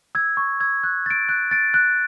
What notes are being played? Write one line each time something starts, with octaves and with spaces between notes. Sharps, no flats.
E6 G#6
C#6
E6 G#6
F#6
A6 D7
F#6
A6 D7
F#6